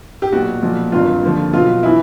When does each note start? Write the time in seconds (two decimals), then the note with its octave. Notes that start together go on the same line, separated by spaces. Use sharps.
0.22 G4
0.32 B1 A#2 F#3 F#4
0.62 B1 A#2 F3
0.92 G#1 G2 D#3 F#3 F4
1.23 D#2 D3 F3
1.53 B1 B2 F#3 F4
1.83 E3 E4